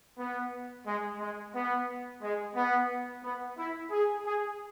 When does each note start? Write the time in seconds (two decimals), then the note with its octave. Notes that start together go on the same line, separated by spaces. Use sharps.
0.18 B3
0.85 G#3
1.20 G#3
1.53 B3
2.22 G#3
2.55 B3
3.23 B3
3.57 E4
3.91 G#4
4.25 G#4